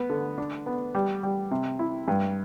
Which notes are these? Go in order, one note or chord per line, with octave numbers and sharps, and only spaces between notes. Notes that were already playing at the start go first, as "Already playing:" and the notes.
Already playing: B3
D3
D4
B3
G3
G3
C3
E4
G2